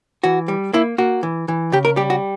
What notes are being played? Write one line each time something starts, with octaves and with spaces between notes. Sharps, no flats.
E3 F#4
G3
A#3 E4
A#3 F#4
E3
E3
C#3 G4
A#4
G3 G4
F#4